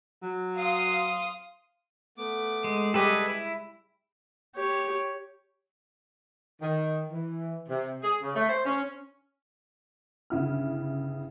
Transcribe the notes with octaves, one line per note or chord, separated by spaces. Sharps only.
F#3
F5 C6 D#6
A3 B3 D6
G#3
G3 G#3 G4 A4 B4 D#5 E5 G#5
E4
G4 C#5
D#3
E3
C3
G#4
C#3
A3
C5
C#4
G1 C#3 E4 F6